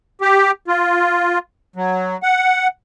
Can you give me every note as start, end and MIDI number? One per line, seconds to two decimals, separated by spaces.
0.21 0.51 67
0.68 1.38 65
1.76 2.17 54
2.23 2.67 78